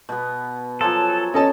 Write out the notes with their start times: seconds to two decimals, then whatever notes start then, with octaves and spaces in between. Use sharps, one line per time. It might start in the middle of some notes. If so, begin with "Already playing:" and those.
0.09 B2 B3
0.81 F3 F#3 F4 A4 G#5
1.34 C#4 A4 D#5 A5